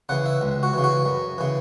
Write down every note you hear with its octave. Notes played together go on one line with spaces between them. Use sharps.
C#3 E3 F#5
E5
C#2
F#4
C#3 E3
F#4
F#2
C#3 E3